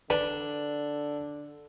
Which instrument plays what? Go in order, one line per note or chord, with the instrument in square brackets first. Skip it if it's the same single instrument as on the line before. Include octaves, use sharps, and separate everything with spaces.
[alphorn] D3 [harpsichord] D4 [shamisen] B4